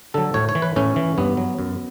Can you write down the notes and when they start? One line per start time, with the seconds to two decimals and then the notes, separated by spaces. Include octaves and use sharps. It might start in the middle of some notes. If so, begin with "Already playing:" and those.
0.14 D3 F#3 A4
0.34 A2 C#5
0.49 C#5
0.55 E3
0.62 B4
0.76 A2 C#4
0.96 E3
1.18 G2 B3
1.37 F#3
1.59 F#2